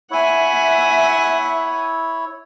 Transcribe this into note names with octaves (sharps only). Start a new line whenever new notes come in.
E4 C#5 E5 F#5 G#5